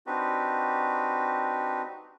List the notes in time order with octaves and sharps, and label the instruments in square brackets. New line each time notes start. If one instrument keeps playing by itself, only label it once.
[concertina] C4 D4 D#4 F#4 G4 B4